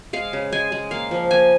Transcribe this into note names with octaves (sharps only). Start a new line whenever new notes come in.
G#3 F5
C#3
G#3 G#5
G#3
A#3 F5
F3
A#3 G#5